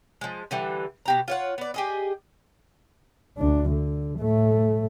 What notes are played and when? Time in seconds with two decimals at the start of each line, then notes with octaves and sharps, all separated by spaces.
0.21 F3 G#3
0.51 D3 E3 G3
1.06 B2 G4 A#5
1.28 F4 C#5 F#5
1.58 B3 D5
1.74 G4 G#4 D#5
3.38 D2 D4
3.69 D3
4.18 A2 A3